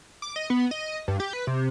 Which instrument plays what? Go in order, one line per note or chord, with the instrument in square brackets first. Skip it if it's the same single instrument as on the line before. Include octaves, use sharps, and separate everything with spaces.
[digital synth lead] D6
D#5
B3
D#5
G2
G4
B4
C3